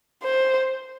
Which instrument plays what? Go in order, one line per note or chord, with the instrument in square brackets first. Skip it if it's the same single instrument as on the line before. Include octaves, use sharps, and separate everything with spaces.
[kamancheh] C5